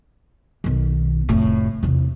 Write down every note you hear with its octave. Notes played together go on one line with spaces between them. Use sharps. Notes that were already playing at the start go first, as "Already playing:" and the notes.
B1 D#3
F1 A2
E2 C3